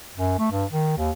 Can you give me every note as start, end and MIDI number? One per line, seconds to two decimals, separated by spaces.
0.17 0.37 42
0.39 0.51 57
0.52 0.65 43
0.72 0.97 51
0.97 1.11 39